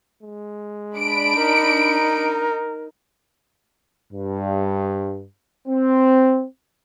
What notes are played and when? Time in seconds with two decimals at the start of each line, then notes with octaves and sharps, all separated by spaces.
0.23 G#3
0.95 D4 B5 D7
1.37 D#4 A#4
4.12 G2
5.68 C4